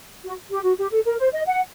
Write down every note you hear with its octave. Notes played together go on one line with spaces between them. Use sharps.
F#4
G4
F#4
G4
A4
A#4
C5
D#5
F#5